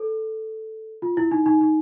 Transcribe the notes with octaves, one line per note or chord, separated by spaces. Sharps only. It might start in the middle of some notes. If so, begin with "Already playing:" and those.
Already playing: A4
F4
E4
D#4
D#4
D#4